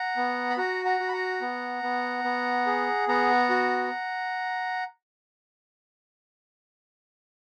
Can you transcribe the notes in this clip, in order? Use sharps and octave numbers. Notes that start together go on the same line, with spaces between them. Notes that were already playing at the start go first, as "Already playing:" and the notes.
Already playing: F#5 A#5
B3
B5
F#4 F#5 A#5
F#5 A#5
F#4
B5
F#5 A#5
B3
B3
B3
G#4
B3 F#5 A#5
F#4